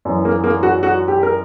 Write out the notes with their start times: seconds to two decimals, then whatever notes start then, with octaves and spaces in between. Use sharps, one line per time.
0.05 F#2 E3
0.25 A#3
0.44 A#3
0.63 F#4
0.83 F#4
1.08 G4
1.23 A#4